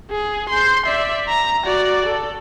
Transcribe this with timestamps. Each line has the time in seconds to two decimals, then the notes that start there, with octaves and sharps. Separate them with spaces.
0.11 G#4
0.49 C6 G6
0.86 D5 E5
1.28 A#5
1.65 F#4 D5
2.06 A4